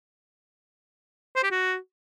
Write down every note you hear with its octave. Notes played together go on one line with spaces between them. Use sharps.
C5
G4
F#4